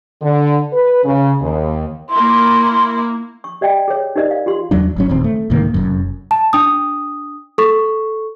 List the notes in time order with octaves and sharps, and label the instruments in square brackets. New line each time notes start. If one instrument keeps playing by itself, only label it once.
[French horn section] D3
B4
C#3
D#2
[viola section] A#3 E4 [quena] C6
[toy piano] C#6
G4 D5 D#5 G5
G#4 C#5
D#4 G4 A#4 D5 D#5
F5
F4 G4 C6
[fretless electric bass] E2 F#3 D4
G1 F#3 C#4
D#1 D#2 C4
A3
C2 G#2 D#3 A#3
F1 F#2
[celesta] A5
D4 D#6
A4 C#6